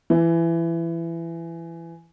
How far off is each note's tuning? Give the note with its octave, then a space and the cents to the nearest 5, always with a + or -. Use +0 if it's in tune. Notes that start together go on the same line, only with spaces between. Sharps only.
E3 +20